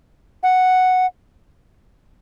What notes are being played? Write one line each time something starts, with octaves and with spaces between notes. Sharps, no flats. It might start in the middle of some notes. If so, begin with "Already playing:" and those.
F#5